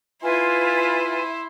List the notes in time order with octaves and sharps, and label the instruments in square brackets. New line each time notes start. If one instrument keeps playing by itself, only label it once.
[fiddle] E4 C6 [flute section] F4 B4 G#5